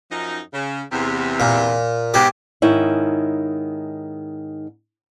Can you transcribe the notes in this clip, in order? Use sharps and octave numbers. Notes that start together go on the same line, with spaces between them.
F#2 F3 D#4
C#3
E2 C3
A#2
G#2 B2 G4
G#2 D#3 C#4 D#4 E4